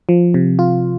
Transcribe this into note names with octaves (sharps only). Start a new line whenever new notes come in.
F3
C3
F4